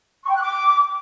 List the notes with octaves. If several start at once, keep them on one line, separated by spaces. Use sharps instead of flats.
C#6
G5
F#6
D6